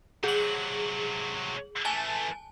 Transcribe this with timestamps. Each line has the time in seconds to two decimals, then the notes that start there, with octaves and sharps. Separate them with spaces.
0.24 C3 F#3 G#4 F#7
1.85 E3 A3 G#5 A5